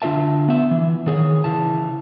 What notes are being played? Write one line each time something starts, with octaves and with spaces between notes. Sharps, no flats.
D3 D4 F4 A#4 E5 A5
B3 E5
E3
D#3 G#4 C5 C#5
C#3 E3 A5